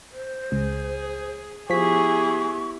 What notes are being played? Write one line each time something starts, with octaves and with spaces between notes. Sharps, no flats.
C5
C#2 G#4
F3 B3 E4 G4 G#4 C#6 B6